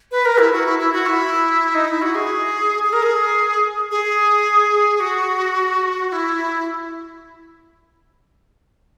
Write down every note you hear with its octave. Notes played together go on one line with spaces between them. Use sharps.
B4
A#4
E4
F#4
E4
E4
F#4
E4
D#4
E4
F#4
G#4
G#4
A#4
G#4
G#4
F#4
F#4
E4